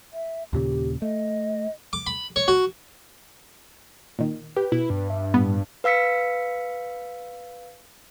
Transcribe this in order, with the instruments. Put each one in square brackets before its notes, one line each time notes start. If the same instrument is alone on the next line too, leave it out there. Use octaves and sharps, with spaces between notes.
[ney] E5
[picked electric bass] D#2 A#2 C#3 [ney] G4
[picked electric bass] A3 [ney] D#5
[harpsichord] D6
B5
C#5
F#4
[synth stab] A#2 D#3
[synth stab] G4 [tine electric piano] B4
[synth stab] B2 [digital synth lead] E4
[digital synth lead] G2
[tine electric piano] E5
[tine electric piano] A2 G3 [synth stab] B3
[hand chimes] B4 F5 E6 B6 C#7